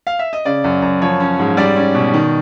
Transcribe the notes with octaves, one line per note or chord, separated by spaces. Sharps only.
F5
E5
D#5
C#3 D5
F#2
F#2
F3 C#5
C#4
G#2
G3 D5
C#4
B2
D#3